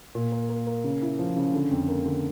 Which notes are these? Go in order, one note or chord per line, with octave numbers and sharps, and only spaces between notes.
A#2
A#3
A#3
A#3
C#3
E4
F3
C#3
D3
F2
A#3
D3